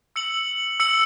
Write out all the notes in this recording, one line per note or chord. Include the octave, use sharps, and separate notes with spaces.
E6 C#7 F#7
E6 C#7 F#7